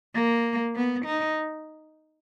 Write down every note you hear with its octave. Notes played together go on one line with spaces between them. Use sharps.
A#3
B3
D#4